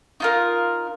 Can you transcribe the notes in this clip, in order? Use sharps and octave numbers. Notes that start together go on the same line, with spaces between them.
D#4 F4 A#4